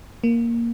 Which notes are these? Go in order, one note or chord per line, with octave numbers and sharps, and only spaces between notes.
A#3